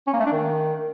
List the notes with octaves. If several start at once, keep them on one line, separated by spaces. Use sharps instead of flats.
C#4
A#3
A3
D4
D#3